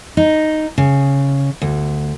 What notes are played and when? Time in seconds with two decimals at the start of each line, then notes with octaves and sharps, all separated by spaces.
0.17 D#4
0.78 C#3
1.61 D2